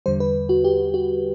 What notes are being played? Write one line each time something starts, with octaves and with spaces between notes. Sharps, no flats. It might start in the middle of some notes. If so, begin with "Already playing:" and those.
E2 D3 G3 C5
B4
F#4
G4
F#4